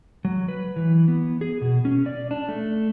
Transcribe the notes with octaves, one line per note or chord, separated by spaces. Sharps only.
F#3
B4
E3
B3
G#4
B2
C#4
D5
D4
A3